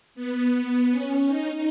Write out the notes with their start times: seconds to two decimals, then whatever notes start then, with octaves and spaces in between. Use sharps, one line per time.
0.15 B3
0.90 C#4
1.27 D#4